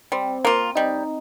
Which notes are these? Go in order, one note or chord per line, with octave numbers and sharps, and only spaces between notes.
G3 C4
A#3 F4
G3 D#4